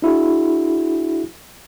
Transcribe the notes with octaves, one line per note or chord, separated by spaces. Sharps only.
D4 E4 F#4 G#4